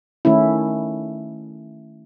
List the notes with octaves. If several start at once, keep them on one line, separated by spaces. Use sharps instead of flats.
D#3 A3 C#4 E4